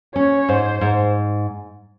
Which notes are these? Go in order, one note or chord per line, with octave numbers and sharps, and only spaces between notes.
C#4 C#5
G#2 C5
G#2